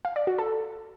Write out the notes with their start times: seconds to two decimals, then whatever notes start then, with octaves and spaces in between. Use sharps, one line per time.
0.05 F5
0.16 D5
0.27 F#4
0.38 A4